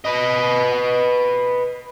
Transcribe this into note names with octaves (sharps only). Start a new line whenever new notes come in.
B4 D#5